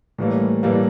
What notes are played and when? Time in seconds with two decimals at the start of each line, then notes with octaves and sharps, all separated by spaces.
0.18 A2 E3 G3 A#3
0.63 A2 E3 G3 A#3